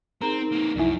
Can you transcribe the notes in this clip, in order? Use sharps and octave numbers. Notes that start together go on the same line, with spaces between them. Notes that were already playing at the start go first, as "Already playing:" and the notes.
C4 D#4 G#4 A#4 A#5
A#3 C4
C2 F#2 F3 E4 G#5